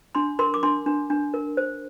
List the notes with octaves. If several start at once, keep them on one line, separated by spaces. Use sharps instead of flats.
D4 C6
A#4 C6
D6
D4 C6
D4
D4
A#4
C5